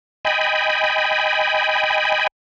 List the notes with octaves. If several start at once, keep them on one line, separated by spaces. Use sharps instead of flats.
D#5 G5 G#5 B5